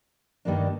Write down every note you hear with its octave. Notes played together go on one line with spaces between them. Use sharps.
G2 D#3 G3 A#3 D4